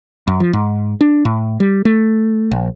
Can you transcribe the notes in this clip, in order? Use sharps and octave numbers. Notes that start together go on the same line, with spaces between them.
F#2
F3
G#2
D4
A2
G3
A3
A#1